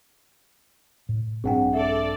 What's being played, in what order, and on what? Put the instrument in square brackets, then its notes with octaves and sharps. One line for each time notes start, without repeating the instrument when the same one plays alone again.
[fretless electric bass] A2
[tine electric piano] A#1 G2 D4 [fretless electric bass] C4 [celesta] G#4 F#5 G5
[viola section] A4 D5 [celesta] E5